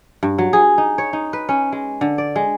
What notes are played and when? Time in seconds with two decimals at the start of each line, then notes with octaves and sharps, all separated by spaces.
0.23 G2
0.38 F#3
0.53 G#4
0.78 D#4
0.98 C#5
1.13 D#4
1.33 B4
1.49 C#4
1.72 G#3
2.01 D3
2.18 D5
2.36 G#3